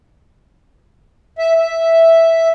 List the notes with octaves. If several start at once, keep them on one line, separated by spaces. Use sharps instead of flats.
E5
E5